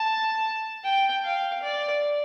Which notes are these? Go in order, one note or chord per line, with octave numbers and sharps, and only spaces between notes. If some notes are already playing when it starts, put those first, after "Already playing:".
Already playing: A5
G5
F5
D5